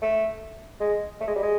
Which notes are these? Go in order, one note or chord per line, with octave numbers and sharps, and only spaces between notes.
A3
G#3
A3
G#3
G3
G#3